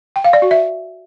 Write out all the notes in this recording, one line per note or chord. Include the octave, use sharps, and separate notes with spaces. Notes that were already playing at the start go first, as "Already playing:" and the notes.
G5
F5
D5
F#4
E5